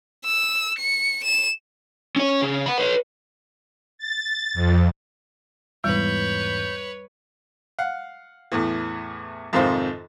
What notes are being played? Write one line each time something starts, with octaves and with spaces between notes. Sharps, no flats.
E6
C#7
E7
C#4 C#5
C#3
F#5 B5
B4 C#5
A6
F2
E2 G#2 G3 B4 C#5 G6
F5 F#5
E2 A2 E3
F2 G#2 C3 D#3 F4 C5